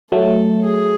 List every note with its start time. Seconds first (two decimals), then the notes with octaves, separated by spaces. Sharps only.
0.12 F#3 A3 A4
0.64 G#4